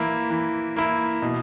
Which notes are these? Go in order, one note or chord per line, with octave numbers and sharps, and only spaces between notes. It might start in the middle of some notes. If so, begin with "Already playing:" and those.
Already playing: E3 A#3 E4
E3
A#3 E4
B2